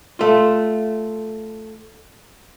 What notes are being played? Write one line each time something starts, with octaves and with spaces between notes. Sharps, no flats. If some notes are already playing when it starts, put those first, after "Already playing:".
A3 F4